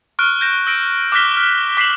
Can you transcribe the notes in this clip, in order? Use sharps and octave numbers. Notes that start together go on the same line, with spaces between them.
C#6 F6 F#6 D7
G6 A#6 E7
E6 A#6 D7
D6 F6 F#6 A#6 B6 G7
F6
D6 B6 C7 E7 F#7